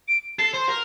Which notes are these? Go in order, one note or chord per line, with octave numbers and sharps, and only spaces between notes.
D7
A4 C7
C5
A#4